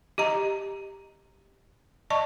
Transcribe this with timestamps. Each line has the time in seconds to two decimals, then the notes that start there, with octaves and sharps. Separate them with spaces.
0.18 G4 D#5 A#5
2.10 D5 D#5 A5 C#6